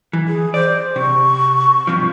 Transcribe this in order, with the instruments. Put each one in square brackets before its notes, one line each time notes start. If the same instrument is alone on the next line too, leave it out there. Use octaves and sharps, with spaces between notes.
[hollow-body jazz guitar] E3
[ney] G#4
[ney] C5 [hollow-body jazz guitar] D5
[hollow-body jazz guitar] C3 [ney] C#6
[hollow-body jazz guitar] G2 C3 F3